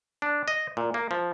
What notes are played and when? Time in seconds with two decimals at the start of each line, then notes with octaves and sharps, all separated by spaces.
0.22 D4
0.48 D#5
0.77 A#2
0.94 A#3
1.11 F3